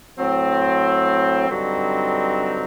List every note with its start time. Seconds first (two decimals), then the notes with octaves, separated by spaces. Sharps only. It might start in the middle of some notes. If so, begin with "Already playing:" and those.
0.17 A2 F#3 C4
1.47 G2 D3 F#3 C4 D#4